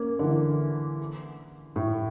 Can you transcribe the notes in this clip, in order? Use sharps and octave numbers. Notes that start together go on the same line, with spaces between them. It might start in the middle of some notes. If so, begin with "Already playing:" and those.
Already playing: A#3 C#4
D3
E3
A2